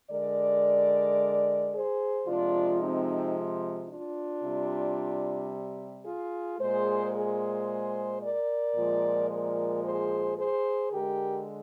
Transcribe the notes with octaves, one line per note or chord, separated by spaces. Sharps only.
D3 G#3 A#4 D5
G#4 C5
C3 F3 G#3 D4 F4
C4 D#4
D4 F4
C3 G3
F4 G#4
A#2 G#3 G#4 C5
G#4 C5
A#4 D5
A#2 F3 G#3
A#4 D5
G#4 C5
G#4 C5
D3 G#3 G4 A#4